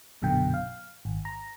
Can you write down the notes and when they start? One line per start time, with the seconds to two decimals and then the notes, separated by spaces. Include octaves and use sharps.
0.22 A#1 F#2 B2 D3 G5
0.54 F5
1.05 G#1
1.25 A#5